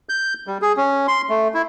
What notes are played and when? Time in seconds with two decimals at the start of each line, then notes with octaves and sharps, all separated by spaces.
0.09 G6
0.47 G3
0.62 G#4
0.77 C#4
1.08 C6
1.29 A3
1.54 E4